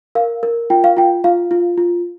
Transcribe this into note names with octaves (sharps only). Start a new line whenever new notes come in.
A#4 F5
A#4
F4 G5
F5
F4 G5
F4 F5
F4
F4